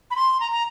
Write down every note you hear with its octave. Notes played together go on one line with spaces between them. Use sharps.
B5
C6
A#5
A#5